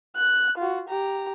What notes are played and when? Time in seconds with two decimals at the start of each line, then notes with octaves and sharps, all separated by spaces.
0.17 F#6
0.58 F4 F#4
0.89 G4 A#5